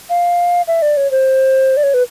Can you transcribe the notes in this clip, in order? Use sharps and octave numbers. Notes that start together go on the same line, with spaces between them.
F5
E5
D5
C#5
C5
D5
C#5
B4